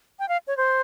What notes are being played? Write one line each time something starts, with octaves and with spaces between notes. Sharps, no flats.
G5
F5
C#5
C5